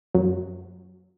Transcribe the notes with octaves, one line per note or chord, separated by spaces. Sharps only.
F#2